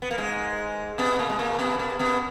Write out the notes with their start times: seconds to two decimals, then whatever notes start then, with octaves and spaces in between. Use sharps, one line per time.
0.02 B3
0.11 A#3
0.18 G#2 G#3
0.98 B2 B3
1.19 A#2 A#3
1.29 G#3
1.39 A#2 A#3
1.59 B2 B3
1.79 B2 B3
1.99 B2 B3